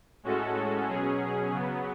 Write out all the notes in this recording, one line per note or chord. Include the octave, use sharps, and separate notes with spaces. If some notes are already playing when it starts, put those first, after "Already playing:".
A2 G#3 C#4 F#4 A4
B2 F#3 C#4 G#4
C#3 F#3 B3